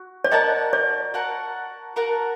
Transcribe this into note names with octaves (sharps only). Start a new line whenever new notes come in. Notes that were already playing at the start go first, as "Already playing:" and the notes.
Already playing: F#4
D5
F#4 A#4 D#5 F#5 A5
D5
F#4 A#4 F#5 A5
F#4 A#4 F#5 A5